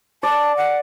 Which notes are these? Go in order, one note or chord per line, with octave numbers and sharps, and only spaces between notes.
D5 A5
F#5